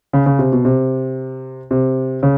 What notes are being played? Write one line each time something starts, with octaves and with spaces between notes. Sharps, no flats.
C#3
C#3
C3
B2
C3
C3
C#3